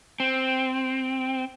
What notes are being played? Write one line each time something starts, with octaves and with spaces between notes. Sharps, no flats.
C4